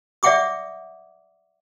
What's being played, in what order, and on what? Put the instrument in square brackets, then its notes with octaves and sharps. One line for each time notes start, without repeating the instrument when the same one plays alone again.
[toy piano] D5 E5 F#5 G5 D6 D#6